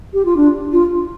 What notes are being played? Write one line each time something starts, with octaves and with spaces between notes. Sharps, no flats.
G4
F4
D4
F4